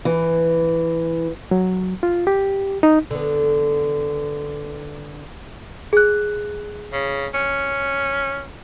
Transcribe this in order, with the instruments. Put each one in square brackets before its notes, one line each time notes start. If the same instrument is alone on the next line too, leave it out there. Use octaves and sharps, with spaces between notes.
[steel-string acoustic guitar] E3
[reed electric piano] F#3
F4
G4
D#4
[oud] D3 B3
[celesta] G#4 F#6
[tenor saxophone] C#3
C#4